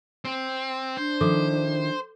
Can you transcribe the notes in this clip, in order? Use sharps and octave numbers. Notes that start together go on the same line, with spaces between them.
C4
D4 C5
D#3 F3 E4 A4 D6